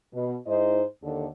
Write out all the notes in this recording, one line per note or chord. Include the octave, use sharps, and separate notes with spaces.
B2
G#2 D#4 E4 C5 D#5
D#2 D3 A4